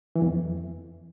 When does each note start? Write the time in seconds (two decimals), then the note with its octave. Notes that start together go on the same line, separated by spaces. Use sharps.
0.16 E3
0.22 E2
0.28 F2